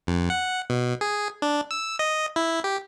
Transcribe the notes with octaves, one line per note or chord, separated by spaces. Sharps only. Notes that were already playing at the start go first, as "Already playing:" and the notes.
F2
F#5
B2
G#4
D4
E6
D#5
E4
G4